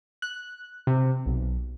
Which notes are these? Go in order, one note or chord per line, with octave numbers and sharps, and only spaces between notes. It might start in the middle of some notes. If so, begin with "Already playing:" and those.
F#6
C3
B1